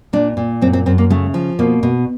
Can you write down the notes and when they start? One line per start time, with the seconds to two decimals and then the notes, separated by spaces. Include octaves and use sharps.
0.13 A#2 D4
0.37 A#2
0.62 F#2 C4
0.73 C4
0.86 F#2 C4
0.98 A#3
1.10 C#3 A3
1.34 F3
1.59 B2 A#3
1.83 B2